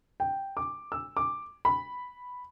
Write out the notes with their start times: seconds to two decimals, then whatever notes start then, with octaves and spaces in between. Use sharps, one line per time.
0.20 G5
0.57 D6
0.92 E6
1.17 D6
1.65 B5